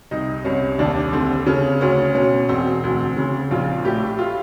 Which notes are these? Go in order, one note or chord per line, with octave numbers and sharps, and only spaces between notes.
C2 D#4
C2 C#4
D#2 D4
D3 C4
C#3 C#4
D2 C#4
B2 C#4
E1 C4
D2
C#3
A#1 F4
A2 G4
F4